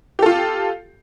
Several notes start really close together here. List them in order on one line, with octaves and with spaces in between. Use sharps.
G4 A4 F4